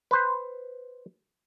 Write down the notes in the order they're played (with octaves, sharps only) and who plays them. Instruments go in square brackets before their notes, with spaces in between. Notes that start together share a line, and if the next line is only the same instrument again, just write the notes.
[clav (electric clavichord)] B4 C5